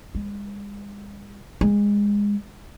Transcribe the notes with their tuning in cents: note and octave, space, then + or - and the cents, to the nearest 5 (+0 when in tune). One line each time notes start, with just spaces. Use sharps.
G#3 -45
G#3 -20